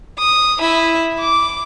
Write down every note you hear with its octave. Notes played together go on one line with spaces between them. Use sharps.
D#6
E4 E5
D6